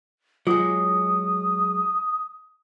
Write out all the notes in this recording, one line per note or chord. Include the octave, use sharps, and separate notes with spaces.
F#3 G#3 F4 D#6